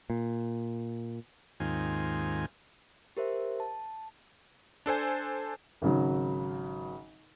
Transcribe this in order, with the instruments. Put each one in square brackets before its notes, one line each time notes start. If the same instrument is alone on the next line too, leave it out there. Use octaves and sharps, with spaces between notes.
[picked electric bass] A#2
[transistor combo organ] D#2 G#2 D#3 C4 F4 G#5
[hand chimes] G4 A#4 C5 E5
A5
[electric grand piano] D4 A4 C5 G#5
[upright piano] G#1 C#3 F#3